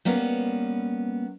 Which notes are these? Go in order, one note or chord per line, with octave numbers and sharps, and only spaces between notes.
G3 A#3 B3 C#4